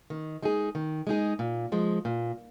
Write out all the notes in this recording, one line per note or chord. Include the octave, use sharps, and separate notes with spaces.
D#3
G#3 D#4 G#4
D#3
G#3 D#4 G#4
A#2
F3 G#3
A#2